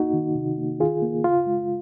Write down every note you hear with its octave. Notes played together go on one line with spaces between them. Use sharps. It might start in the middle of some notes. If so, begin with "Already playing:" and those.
Already playing: A#3 D#4 F#4
D#3
C3
A#3
D#3 F4 G#4
A#3
C#3 F4
G#3